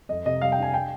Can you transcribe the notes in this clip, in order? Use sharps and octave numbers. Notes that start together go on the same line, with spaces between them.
F2 D#5
C3 D#5
G3 F5
G5
D4 G#5
G5